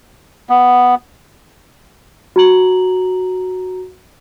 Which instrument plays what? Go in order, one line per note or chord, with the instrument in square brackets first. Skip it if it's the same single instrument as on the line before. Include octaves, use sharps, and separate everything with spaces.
[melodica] B3
[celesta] F#4 A#5 F#7